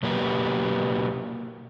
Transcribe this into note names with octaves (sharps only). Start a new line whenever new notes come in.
B2 F#3 A#3 G4 B4